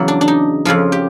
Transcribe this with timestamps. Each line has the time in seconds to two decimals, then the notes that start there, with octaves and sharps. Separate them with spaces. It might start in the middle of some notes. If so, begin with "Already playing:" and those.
Already playing: E2 C#3 F#3
0.08 D4
0.21 D4
0.28 D#4
0.65 F2 C#3 F3 F4
0.92 G4